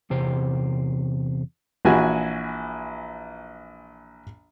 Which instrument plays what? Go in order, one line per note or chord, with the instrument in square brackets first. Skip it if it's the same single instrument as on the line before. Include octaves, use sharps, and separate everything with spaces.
[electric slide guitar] E2 C3 C5
[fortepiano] A#1 E3 F#4 G#5